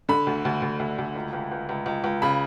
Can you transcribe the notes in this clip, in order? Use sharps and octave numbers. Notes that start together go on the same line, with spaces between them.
D3 B5
D2
D2
D2
D2
D2
C#2
C#2
C#2
C#2
C#2
C#2
C#3 B5